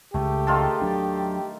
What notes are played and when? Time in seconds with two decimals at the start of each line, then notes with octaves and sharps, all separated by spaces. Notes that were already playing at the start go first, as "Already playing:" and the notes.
0.14 C#2 A3 G4
0.47 D#3 F4 A4
0.82 F#3 D4